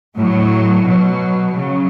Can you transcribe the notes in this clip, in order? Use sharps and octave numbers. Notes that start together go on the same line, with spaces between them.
A2 F#3
B2 F#3
C#3 F#3